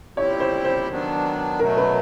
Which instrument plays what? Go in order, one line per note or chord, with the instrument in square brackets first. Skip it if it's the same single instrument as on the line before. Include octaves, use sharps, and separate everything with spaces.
[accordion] A#2 G3 C4 E4 G4 [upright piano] C#5
[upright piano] C5
C5
[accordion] D#3 F#3 B3 D4
[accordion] B2 F#3 A3 [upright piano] A#4
[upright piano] B4